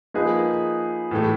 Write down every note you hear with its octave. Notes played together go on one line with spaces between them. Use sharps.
F3 A#3 D#4 G#4 B4
A2 E3 A3